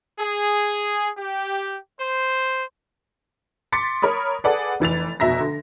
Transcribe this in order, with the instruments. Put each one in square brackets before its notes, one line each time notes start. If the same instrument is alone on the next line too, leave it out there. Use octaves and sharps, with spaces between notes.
[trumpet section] G#4
G4
C5
[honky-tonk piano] C6 D6 A6 B6 C#7
A#4 C#5 B5 D#6
G#4 A4 B4 D5 F#5
F1 E3 A6 F7
F1 B2 E5 A#5 A#6
D3